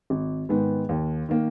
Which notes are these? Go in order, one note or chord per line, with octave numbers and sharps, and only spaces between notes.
G#1
G#2 D#3 G#3 B3
D#2
D#3 A#3